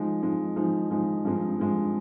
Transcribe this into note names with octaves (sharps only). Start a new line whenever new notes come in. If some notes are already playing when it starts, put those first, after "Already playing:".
Already playing: F3 G#3 D#4
F3 G#3 D#4
F3 G#3 D#4
F3 G#3 D#4
G2 F3 G#3 C4
G2 F3 G#3 C4